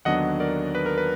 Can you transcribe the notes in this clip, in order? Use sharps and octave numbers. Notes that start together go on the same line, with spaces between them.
D#2 D3 F#3 B3 D4 D#5 F#5
A#4 D5
B4
A#4
B4